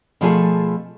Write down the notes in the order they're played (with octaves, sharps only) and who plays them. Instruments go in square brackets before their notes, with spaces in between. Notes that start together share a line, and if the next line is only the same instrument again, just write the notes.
[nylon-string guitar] B2 F3 A3 F4 G#4 A4